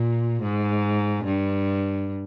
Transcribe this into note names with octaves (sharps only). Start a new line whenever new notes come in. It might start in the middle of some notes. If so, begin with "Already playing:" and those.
Already playing: A#2
G#2
G2